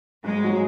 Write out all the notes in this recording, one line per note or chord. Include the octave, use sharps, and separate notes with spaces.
G#1 G#3
F#3 D#4 F#4